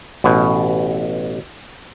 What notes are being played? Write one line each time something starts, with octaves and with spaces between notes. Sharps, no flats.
A1 B2